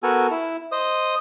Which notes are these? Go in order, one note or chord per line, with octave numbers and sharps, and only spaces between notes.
B3 F#4 A4 A#4 G#5
E4
C5 D#5 D#6